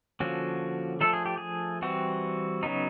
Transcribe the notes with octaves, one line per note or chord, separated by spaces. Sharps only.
D3 F3 A#3 C#4 F#4
F3 A3 D4 A4
G#4
G4
G#4
E3 G3 C4 F#4
C#3 F#3 B3 D#4